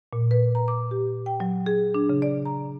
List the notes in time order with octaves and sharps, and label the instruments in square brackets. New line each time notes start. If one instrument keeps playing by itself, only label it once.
[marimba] A#2
B4
A#5
D6
G4
G5
F#3
G#4
D4
C#3
D5
A#5